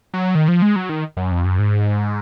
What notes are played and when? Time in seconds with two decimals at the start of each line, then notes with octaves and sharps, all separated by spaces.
0.14 F#3
0.35 D#3
0.48 F3
0.62 G#3
0.76 F#3
0.89 D#3
1.17 F#2
1.31 F2
1.45 F#2
1.59 G#2